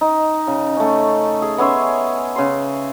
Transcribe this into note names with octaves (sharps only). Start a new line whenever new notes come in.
D#4
C#3
A3 C#4
G#4
B3 C#4 E5 C6
C#3 C6